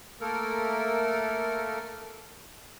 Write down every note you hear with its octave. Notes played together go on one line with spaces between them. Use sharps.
A3 A#3 A4 A#4